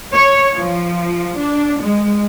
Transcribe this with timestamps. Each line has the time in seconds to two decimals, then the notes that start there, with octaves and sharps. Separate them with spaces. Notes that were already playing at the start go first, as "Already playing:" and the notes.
0.14 C#5
0.57 F3
1.38 D4
1.82 G#3